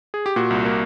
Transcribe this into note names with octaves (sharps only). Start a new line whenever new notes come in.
G#4
G4
A#2 F#4
C2
A#3